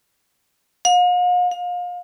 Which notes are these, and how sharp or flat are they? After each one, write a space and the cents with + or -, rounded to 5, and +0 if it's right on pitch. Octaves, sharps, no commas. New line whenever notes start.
F5 +45
F5 +30